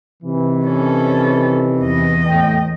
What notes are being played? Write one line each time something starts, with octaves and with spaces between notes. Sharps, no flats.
C3 D#3 E3
C#4 A4
E2 D#5
A2 A3 G5